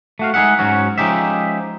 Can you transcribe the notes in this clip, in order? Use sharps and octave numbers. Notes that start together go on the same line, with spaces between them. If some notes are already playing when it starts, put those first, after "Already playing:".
A3 F#4 F5
G#3 D#4 G#4 E5 F#5
G#2 F#3 C#4 F#4
F3 G#3 C#4 D#4 G4 E5